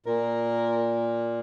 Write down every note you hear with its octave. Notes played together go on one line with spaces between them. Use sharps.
A#2 A#4